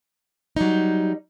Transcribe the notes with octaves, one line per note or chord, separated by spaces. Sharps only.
F#3 G3 D#4